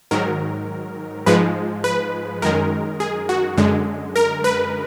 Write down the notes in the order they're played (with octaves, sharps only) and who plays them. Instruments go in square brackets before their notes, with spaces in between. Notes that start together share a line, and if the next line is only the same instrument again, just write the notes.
[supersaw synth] G#2 D#3 F#3 A#4
G#2 F3 G#3 B4
B4
F#2 D#3 G#3 A#4
G#4
F#4
F#2 D3 G#3
A#4
B4